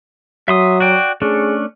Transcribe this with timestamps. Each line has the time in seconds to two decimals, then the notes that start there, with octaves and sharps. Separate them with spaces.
0.48 F#3 E5 C6 D#6
0.80 F#4 D5 G5
1.22 A3 C#4 D4 G#4